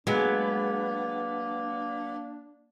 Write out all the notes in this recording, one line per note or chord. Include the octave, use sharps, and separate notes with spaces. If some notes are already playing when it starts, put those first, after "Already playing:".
F#3 G#3 A#3 B3 D4